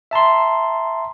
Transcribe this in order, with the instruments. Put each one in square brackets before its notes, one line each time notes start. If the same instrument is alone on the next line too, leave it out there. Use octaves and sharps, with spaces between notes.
[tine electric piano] E5 A5 A#5 C6